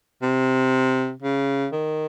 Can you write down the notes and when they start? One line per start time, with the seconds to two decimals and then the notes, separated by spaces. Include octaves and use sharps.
0.22 C3
1.22 C#3
1.72 D#3